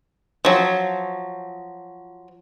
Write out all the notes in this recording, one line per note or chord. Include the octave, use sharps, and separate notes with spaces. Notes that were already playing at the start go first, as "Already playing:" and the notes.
F3 F#3